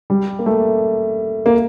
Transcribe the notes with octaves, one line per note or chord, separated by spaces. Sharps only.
G3
A#3
A3
A#3